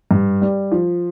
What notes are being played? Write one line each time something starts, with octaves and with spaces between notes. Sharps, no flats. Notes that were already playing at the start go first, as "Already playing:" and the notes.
G2
G3
F3